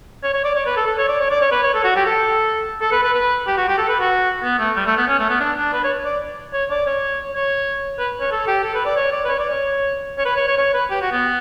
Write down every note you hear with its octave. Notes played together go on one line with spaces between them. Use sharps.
C#5
C#5
D5
C#5
B4
A4
A4
C#5
D5
C#5
D5
C#5
B4
C#5
A4
F#4
G4
A4
A4
B4
B4
B4
G4
F#4
G4
A4
B4
F#4
B3
A3
G3
A3
B3
C#4
A3
B3
D4
D4
B4
C#5
D5
C#5
D5
C#5
C#5
B4
C#5
A4
G4
A4
B4
D5
C#5
D5
B4
C#5
D5
C#5
C#5
B4
C#5
C#5
C#5
B4
G4
F#4
B3